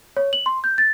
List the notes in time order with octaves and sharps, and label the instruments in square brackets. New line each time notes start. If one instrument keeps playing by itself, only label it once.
[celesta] C#5
F#7
C6
G6
A6